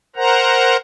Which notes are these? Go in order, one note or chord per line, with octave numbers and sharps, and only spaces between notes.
A#4 C5 F#5 A#5